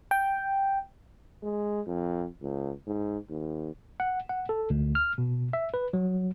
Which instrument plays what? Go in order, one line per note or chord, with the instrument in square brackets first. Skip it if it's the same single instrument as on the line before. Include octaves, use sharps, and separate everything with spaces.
[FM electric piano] G5
[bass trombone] G#3
F2
C#2
G#2
D#2
[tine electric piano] F#5
F#5
A4
D2
F6
B2
E5
B4
F#3